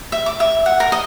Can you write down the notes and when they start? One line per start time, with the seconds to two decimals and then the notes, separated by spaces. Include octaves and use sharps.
0.12 E5
0.26 D6
0.40 E5
0.66 F#5
0.80 A#4
0.92 D#5